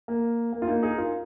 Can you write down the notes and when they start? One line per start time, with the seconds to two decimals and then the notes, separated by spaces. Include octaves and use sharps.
0.08 A#3
0.53 A#3
0.62 F4
0.68 A#3 D#4
0.83 D#4 G#4
0.98 F4 A#4